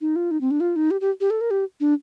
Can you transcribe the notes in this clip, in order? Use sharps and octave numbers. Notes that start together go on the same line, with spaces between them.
D#4
F4
D#4
C4
D4
F4
D#4
G4
G4
G4
A4
A#4
G4
D4